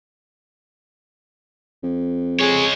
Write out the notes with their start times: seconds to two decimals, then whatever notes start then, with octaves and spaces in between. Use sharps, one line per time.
1.83 F2
2.41 G#3 G#4 C#5